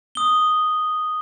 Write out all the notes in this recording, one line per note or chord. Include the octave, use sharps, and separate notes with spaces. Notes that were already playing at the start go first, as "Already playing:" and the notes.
D#6 G7